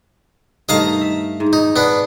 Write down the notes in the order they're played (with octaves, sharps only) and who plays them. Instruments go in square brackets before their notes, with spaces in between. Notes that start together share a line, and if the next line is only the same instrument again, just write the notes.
[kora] G2 D#3 A3 [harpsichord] D#5 F5 A#5
[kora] E5
G#2
[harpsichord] D#4
B3 D4